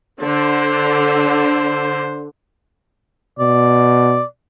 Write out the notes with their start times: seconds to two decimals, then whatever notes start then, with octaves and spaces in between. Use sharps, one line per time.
0.21 D3 C5
3.39 B2 D5